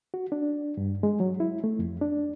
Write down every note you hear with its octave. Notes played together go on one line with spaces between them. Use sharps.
F#4
D4
G2
G#3
F#3
E4
A3
F2
D4